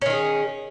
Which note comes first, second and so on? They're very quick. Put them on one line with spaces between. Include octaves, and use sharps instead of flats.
C#4 D#3 G#4